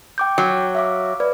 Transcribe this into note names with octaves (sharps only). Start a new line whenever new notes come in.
G5 D6 G6
F#3
E5 F5 D6
B4 D5